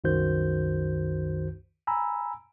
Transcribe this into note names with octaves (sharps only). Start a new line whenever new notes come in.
C2 F#2 D#3 F#4 C5 G6
G#5 A#5 B5 E6